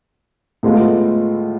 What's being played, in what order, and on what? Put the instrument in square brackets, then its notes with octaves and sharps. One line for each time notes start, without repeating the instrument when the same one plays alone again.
[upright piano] A2 G#3 B3 F4 A4